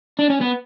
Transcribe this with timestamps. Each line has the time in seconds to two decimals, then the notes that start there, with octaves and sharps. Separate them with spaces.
0.19 D4
0.30 C#4
0.41 B3